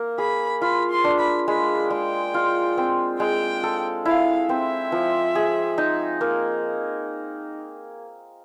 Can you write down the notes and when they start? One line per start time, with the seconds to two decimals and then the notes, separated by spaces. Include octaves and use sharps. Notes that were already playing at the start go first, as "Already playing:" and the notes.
Already playing: A#3
0.18 G#4 B5
0.62 F4 B5
0.90 C6
1.04 D4
1.19 B5
1.48 G#3 B5
1.90 G#3 G5
2.34 F4
2.77 C4
3.20 G#3 G5
3.64 A4
4.05 E4 F5
4.49 C4 E5
4.92 F3
5.35 G#4
5.78 D#4
6.21 A#3